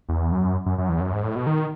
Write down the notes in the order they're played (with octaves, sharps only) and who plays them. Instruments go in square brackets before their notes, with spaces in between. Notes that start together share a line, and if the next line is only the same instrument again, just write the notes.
[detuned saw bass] E2
F#2
F#2
F#2
E2
F#2
G#2
A2
B2
D#3